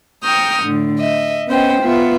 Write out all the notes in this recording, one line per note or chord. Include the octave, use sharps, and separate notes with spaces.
G5 A#5 C#6 D#6 F6 G6
A2 D3
D#5 E5
B3 C#4 C5 D#5 G5
B3 F4 E5